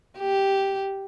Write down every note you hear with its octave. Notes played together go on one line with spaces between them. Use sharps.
G4